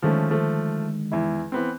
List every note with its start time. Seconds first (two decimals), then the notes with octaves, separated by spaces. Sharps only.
0.02 D3 D#3 F3 G#3 A3 C#4
0.30 F3 A3
1.12 E2 E4
1.52 E3 B3 C4